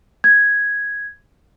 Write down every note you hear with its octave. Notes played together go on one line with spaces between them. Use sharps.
G#6